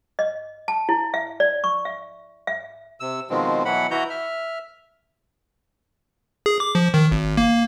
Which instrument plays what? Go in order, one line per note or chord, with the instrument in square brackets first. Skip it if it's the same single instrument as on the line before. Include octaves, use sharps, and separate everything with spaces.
[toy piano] D#5
A5
E4
E5
D5
C#6
E5
E5
[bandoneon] C3 E6
B2 D#3 F3 G#3 C4
B2 E3 F#3 F#5 B5
E3 E4 F#4 A#5 G6
E5 F6
[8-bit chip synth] G#4
D6
F3
D#3
G#1
A#3